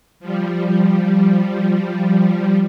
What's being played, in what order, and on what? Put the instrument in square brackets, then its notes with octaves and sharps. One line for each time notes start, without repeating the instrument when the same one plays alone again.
[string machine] F3 G3